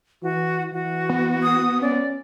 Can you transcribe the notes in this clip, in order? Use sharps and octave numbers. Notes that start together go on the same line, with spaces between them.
E3 F#4
E3 F#4
B3
D#6
C#4 D5